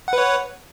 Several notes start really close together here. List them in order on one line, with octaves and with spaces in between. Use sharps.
F#5 B4 C#5